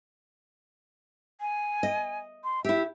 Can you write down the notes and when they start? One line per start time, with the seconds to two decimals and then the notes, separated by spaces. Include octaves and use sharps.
1.41 G#5
1.83 D#5
2.44 C6
2.64 E4 G4 E5